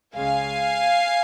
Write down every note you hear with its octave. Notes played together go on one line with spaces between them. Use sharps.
C#2 C#3 G#3 F5 G#5